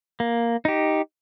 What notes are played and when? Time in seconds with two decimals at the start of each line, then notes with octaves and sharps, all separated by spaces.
0.20 A#3
0.65 D#4 G4